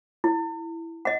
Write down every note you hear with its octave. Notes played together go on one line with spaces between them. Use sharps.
E4
D#5 F#5